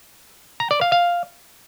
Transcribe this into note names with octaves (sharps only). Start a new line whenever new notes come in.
A#5
D5
F5
F5